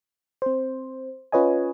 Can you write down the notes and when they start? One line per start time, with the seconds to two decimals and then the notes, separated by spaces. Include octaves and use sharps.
0.42 C4 C5
1.32 C#4 F4 B4 C#5 D#5 G#5